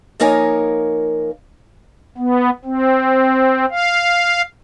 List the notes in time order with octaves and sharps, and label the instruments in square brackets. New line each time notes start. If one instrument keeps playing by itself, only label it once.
[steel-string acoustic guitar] F3 A#3 D#4 A#4 C#5 G#5
[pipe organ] B3
C4
F5